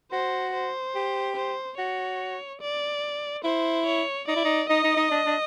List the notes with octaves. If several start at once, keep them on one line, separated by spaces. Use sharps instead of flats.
F#4 C5
C5
G4
C5
F#4 C#5
D5
E4 C5
C#5
D#4 D5
E4
D#4
D#4 D#5
D#4
D#4
D4
D4